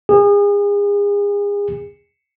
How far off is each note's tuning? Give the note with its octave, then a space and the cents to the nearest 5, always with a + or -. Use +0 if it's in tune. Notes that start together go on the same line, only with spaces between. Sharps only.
G#4 -35